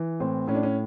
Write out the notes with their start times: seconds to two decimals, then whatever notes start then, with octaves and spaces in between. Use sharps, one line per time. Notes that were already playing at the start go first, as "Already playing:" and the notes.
Already playing: E3
0.20 A2 C4
0.48 A2 C#4
0.55 D4
0.63 C#4